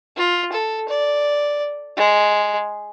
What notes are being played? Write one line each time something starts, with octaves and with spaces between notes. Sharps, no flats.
F4
A4
D5
G#3